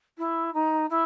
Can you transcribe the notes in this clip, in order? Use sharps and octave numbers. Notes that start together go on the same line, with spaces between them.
E4
D#4
E4